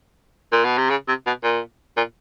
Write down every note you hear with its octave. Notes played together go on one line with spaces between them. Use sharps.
A#2
B2
C3
C#3
C3
B2
A#2
A#2